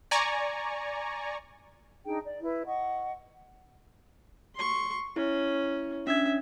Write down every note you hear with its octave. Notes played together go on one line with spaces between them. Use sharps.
D5 G#5 A#5 C#6
D4 D#4 G#4 G5
D5
E4 B4
D#5 F#5 C#6
C6 C#6
C#4 E4
C#4 D4 E5 G#6